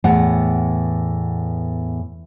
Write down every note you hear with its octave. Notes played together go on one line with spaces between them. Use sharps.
E2 A2 B3 F#5